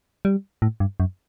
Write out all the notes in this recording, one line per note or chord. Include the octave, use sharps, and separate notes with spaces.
G3
A2
G2
F#2